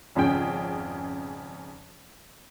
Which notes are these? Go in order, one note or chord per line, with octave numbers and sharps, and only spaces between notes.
G#1 F2 C#3 C#4 G#4 G5